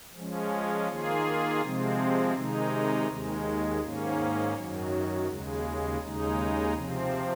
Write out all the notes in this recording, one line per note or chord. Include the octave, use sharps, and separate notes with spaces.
F3 G#3 C#4
D#3 A#3 F4 G#4
C3 F3 G#3 C4
C3 D#3 G#3 D#4
D#2 D#3 G#3
G#2 D#3 A#3 C#4
F#2 D#3 F#3
D#2 C#3 G#3
D#2 C#3 G#3 D#4
C3 F3 C4